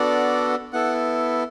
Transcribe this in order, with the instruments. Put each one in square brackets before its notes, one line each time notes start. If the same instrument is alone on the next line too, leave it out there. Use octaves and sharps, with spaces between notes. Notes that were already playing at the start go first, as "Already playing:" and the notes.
Already playing: [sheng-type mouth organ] B3 D4 F#4 A4 D5
B3 E4 A4 F#5